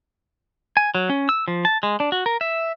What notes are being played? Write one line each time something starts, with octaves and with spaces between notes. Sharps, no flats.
G#5
F#3
C#4
E6
F3
A5
G#3
D4
F#4
A#4
E5